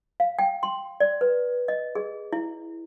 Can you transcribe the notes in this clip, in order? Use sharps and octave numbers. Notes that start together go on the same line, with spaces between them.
F5
G5
C6
D5
B4
D#5
G#4
E4